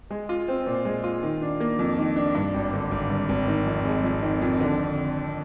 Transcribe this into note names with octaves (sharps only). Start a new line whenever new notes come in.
G#3
F4
C4
A#2
G#3
F4
D#3
D4
A#3
F2
D#3
D4
G2
G#1
D3
G#1
G2
G#1
D#3
F2
G#3
F2
D#3
F2
D3